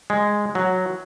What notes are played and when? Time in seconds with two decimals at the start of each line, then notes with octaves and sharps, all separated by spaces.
0.10 G#3
0.55 F#3